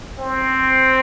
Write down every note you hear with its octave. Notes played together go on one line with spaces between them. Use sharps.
C4